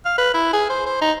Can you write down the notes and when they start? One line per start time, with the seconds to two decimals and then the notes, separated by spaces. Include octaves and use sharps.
0.05 F5
0.18 B4
0.34 E4
0.53 G#4
0.70 C5
0.86 C5
1.01 D#4